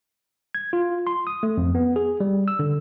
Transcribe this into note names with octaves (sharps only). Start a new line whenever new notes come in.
G#6
F4
C6
D#6
A3
F2
B3
G#4
G3
E6
D3